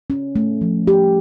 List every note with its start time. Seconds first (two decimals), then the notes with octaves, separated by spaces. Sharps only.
0.10 C#4
0.36 A3
0.61 F3
0.87 G4